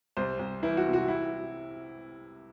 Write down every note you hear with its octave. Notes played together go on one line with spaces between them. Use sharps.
C2 C5
C2
E3 E4
F#4
C3
F#4
E4